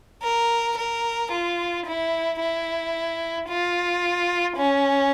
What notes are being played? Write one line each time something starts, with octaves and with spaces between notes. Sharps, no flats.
A#4
A#4
F4
E4
E4
F4
C#4